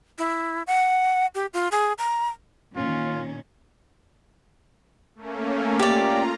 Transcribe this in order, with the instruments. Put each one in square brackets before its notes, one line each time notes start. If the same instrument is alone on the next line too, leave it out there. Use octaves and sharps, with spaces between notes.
[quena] E4
F#5
G4
F4
G#4
A#5
[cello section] A#2 D#3 C#4 [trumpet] F4
[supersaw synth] A3 A#3 C#4
[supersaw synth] F4 A#5 [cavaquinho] G4 D5